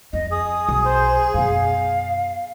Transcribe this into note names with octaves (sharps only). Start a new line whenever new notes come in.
F2 D#5
G#4 D#6
B1
C5
F#2 B2 F5